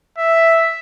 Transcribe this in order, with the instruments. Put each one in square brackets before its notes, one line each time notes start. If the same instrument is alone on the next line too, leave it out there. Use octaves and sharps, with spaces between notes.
[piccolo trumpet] E5